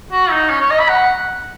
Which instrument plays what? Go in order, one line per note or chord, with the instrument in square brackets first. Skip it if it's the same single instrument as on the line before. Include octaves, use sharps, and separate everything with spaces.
[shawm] F#4
D#4
C#4
C#5
D#5
B5
F#5